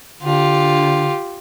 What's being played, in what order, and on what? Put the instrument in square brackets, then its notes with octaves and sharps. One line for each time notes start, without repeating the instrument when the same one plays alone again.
[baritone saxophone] D3 [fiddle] F4 G4